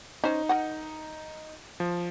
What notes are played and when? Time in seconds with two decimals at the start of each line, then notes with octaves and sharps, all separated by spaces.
0.24 C#4 D#4 C5 C#5
0.49 A#4 D#5 F#5
1.80 F3